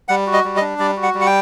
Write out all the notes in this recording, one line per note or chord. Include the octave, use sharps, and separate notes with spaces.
G3 F#5
F#4
D#5
G3
D#5
D4
G3 D5
F#4
F#5
G3
F#5
G5